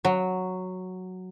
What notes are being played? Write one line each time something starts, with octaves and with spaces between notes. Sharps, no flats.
F#3